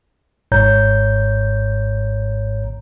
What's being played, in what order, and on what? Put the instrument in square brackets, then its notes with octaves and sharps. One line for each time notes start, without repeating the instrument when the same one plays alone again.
[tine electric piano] G#1 G#2 C#5 A#5 G6